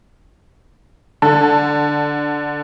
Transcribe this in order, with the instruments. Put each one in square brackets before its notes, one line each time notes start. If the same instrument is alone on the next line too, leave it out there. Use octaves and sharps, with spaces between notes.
[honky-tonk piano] D3 [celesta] A5